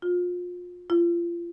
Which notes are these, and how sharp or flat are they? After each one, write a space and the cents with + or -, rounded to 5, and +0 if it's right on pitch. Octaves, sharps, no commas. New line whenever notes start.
F4 +30
F4 -30